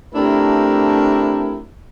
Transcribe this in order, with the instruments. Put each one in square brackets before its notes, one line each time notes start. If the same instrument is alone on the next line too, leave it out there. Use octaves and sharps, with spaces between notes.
[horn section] A3 C4 D4 E4 G4 A#4